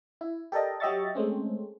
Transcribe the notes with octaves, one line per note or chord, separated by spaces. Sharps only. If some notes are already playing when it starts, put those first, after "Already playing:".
E4
G4 A4 A#4 D5 D#5
F#3 G4 D#5 E5 C#6 A6
G#3 A3 C4 C#4